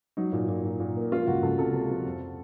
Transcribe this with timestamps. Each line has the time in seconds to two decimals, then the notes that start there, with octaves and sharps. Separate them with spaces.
0.17 F#3 D#4
0.33 A#2
0.48 A#2
0.64 A#2
0.80 A#2
0.96 A#3
1.12 F3 F4
1.27 C#2 F#4
1.43 C#2 A4
1.58 C3 A4
1.74 C3
1.90 F3
2.06 F2